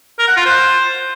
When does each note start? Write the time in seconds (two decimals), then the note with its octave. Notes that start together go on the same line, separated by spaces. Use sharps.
0.19 A#4
0.28 F#5
0.37 F4
0.46 C5